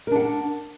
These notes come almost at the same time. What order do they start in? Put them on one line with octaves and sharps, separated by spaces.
A#4 D4 F#5